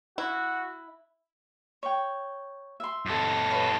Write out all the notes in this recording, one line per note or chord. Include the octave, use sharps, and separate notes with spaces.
E4 F#4
C#5 G5
E5 C6
F#2 A4
B4 C#5 F5